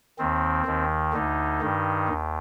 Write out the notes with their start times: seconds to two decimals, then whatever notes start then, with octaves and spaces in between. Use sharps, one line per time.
0.18 D#2 D#3 C4
0.66 D#2 D#3
1.13 D2 D3 D#4
1.61 G2 D#3
2.09 D#2